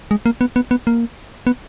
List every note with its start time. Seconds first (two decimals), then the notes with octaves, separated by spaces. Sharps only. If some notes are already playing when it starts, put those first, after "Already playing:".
0.11 G#3
0.26 A#3
0.41 B3
0.56 B3
0.71 B3
0.87 A#3
1.47 B3